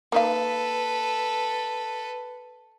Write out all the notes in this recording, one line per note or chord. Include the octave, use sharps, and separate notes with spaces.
A#3 D#4 A4 B4 F5